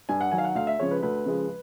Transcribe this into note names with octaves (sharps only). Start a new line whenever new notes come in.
G2 G#5
F#5
D#3 F#3 G#5
F5
F#5
D2 F5
E5
C#3 F3 G#3 C#5
B4
D2 B4
C#3 F3 G#3